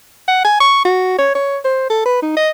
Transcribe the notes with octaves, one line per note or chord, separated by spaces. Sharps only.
F#5
G#5
C#6
F#4
C#5
C#5
C5
A4
B4
D#4
D#5